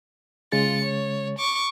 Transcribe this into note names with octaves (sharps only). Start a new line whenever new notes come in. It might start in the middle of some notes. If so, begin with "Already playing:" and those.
C#3 G#3 F4 A6 C#7
C#5
C#6 D6